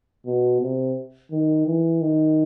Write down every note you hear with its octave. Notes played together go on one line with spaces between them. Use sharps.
B2
C3
D#3
E3
D#3